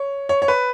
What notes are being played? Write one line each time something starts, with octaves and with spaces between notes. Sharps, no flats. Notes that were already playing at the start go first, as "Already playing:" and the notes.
Already playing: C#5
C#5
C#5
B4